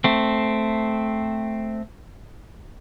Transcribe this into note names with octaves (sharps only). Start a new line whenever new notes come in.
A3 C4